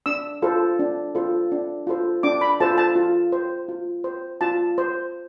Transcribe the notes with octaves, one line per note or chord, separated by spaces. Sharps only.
D4 E6
F4 A4 C5
D4
F4 A4 C5
D4
F4 A4 C5
D4 D6
B5
F4 A4 C5 A5
A5
F4
C5
F4
C5
F4 A5
C5